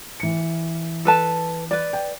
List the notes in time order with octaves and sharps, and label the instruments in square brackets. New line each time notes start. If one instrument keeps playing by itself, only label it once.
[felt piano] E3 C#7
[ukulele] A4 B4 A5
B4 D5
[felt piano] G5